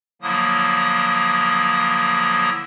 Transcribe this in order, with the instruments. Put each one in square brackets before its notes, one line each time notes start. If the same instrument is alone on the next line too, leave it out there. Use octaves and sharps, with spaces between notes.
[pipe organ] D3 F3 F#3 A#3 E4 D#6